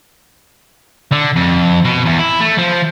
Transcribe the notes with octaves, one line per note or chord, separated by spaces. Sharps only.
D3
F2
B2
E2
E4
A3
F3